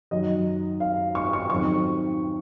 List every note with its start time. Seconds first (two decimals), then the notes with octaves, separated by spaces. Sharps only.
0.11 F#2 D#3 F#3 D#5
0.80 F5
1.15 C#6
1.33 C#6
1.50 F2 D#3 F#3 C#6